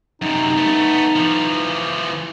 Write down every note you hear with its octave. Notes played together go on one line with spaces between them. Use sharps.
F#2 C3 D#4
A3 B3
E3 F3